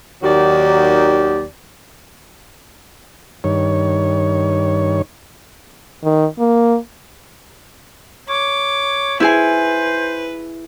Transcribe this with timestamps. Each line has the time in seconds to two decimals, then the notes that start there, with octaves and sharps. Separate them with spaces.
0.23 D#2 D#3 F#3 F#4 G4 D5
3.44 G2 D#3 C#5
6.04 D#3
6.39 A#3
8.29 C#5 D6
9.20 E4 G#4 B4 C5 G#5